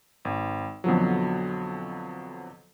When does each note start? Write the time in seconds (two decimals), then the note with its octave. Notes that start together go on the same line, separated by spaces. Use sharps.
0.25 G#1
0.84 F2 B2 D3 F3 F#3